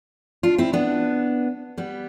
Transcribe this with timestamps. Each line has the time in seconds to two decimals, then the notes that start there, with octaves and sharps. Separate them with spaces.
0.43 D4 F4
0.58 C4 E4
0.73 B3 D4
1.78 G3 B3